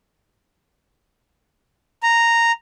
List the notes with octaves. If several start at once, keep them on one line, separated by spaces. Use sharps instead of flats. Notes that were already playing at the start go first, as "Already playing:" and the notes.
A#5